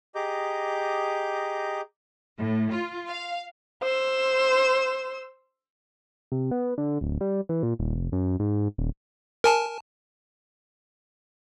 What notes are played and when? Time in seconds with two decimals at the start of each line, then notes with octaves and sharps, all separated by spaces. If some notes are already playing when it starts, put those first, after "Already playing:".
0.15 G4 G#4 D#5 A#5 D6 G6
2.38 A2
2.72 F4
3.09 F5
3.82 C5 E6
6.32 C3
6.51 B3
6.78 D3
7.01 D1
7.21 G3
7.49 E3
7.63 A#2
7.79 D#1
7.95 F1
8.12 F#2
8.40 G#2
8.78 D#1
9.44 A#4 G#5 A5